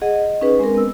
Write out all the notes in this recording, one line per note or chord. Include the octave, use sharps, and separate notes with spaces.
G#4 D#5 F#5
D#5
C#4 D#4 G#4 B4
G#3 C4 D4 A#4
B3 E6